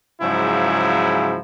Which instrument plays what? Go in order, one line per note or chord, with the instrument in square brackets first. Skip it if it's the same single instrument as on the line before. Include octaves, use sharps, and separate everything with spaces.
[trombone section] G#2 C#3 F3 F#3 E4